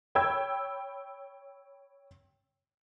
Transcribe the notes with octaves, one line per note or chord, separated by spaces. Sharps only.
C#5 G5 B5 E6 G#6